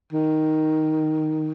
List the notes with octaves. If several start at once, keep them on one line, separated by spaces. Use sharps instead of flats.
D#3